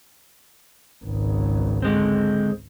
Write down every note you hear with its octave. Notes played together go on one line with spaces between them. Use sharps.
G#1 C#2
D3 G#3 C4